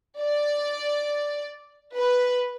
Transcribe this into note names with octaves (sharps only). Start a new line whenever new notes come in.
D5
B4